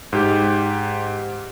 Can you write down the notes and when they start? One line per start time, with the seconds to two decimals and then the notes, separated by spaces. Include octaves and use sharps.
0.13 G#2 G4